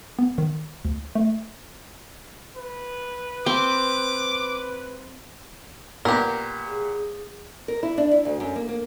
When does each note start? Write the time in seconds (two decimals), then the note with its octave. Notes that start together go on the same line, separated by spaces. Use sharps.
0.19 B3
0.38 D#3
0.85 D2
1.15 A3
2.56 B4
3.46 C4 D6
6.05 A#2 B3 G4 A#4
6.68 G#4
7.68 A#4
7.83 E4
7.98 D4
8.11 E4
8.25 D2
8.40 F#2
8.56 A#3
8.69 A#3